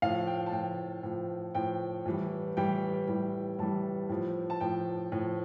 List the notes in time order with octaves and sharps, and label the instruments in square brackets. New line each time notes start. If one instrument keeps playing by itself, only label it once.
[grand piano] A2 F3 F5
G5
A5
A2 F3 G5
A2 F3
A2 F3 G5
A2 E3 G3
A2 E3 G3 G5
A2 E3 G3
A2 E3 G3 A5
A2 F3
A5
A2 F3 G5
A2 F3